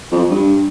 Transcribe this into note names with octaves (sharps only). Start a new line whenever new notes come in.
F2
G2